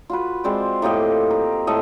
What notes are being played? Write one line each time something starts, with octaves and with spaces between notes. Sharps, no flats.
F4 F#4 B4
G#3 C4 C5 D5
A2 A#3 G4 D#5
A#4
A2 A4 D#5